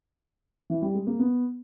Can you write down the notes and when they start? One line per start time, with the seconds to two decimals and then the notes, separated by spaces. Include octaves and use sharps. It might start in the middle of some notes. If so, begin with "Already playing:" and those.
0.70 E3
0.82 G3
0.94 G#3
1.07 A#3
1.19 B3